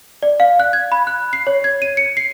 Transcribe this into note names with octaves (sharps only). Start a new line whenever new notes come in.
D5
F5
F#6
G#6
B5
F#6
C7
C#5
G#6
D#7
C#7
C7